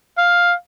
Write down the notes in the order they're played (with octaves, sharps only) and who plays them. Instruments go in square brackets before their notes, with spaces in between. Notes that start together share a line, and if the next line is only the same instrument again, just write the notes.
[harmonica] F5